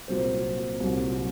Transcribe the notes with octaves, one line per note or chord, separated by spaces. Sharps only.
C2 A#2 F#3 A#3 C5
C2 A#2 F#3 A#3